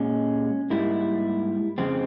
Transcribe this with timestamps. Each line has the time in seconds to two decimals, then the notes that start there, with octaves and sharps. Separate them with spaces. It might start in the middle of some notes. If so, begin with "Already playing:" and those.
Already playing: A#2 G#3 C#4
0.70 G#2 G3 A#3 E4
1.78 F2 C#3 F3 G#3 C4